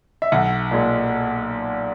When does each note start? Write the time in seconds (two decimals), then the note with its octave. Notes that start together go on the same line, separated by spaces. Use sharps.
0.22 E5
0.32 B1 F#5
0.71 A#2 G#3